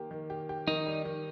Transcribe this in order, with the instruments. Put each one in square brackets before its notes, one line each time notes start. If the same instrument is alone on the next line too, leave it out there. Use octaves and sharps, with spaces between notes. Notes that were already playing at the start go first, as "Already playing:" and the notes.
Already playing: [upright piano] D#3 A#3 G4
D#3
G4
G4
[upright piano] D#3 [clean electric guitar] D#4
[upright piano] G3
D#3